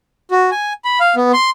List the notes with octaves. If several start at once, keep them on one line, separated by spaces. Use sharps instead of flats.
F#4
G#5
B5
F5
B3
C6